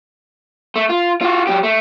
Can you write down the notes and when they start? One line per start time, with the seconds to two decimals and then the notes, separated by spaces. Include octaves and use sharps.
0.76 A3
0.89 F4
1.21 F4 F#4
1.47 F#3 G4
1.63 A3